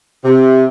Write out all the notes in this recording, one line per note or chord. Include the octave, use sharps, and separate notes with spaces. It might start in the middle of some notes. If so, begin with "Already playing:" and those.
C3